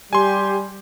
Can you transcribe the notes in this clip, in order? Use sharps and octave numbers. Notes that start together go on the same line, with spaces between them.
G3 G4 G#5 C6